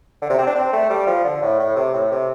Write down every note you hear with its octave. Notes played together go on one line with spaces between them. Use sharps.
D3
C3
C4
D4
C4
A3
G3
F3
D3
A2
A2
C3
A2
C3